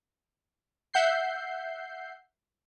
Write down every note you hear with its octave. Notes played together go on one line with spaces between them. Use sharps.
E5 F#5 G6 C7